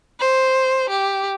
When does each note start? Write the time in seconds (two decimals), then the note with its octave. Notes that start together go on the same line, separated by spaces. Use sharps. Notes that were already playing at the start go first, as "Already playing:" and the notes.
0.20 C5
0.90 G4